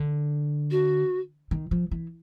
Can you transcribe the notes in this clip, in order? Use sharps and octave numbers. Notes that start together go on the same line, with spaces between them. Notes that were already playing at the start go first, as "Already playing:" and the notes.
Already playing: D3
F#4
D#3
F3
E3